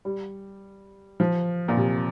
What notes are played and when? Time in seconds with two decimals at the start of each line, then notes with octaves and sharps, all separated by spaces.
0.05 G3
1.20 F3
1.68 A#2
1.77 C3